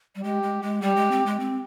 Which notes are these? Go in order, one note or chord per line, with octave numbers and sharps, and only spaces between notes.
G3
G#3 G4
G#3
G#3
G3 G4
G#3
C4
G#3
C4